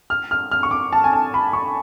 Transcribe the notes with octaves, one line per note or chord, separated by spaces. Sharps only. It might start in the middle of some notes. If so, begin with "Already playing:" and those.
F6
F6
F6
C#6
D6
A5
G#5
A5
B5
C#6